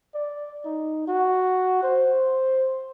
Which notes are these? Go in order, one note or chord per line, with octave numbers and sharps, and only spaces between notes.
D5
D#4
F#4
C5